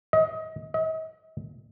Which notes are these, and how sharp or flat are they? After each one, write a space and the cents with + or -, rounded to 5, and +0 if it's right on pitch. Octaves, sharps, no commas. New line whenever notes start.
D#5 +30
D#5 +45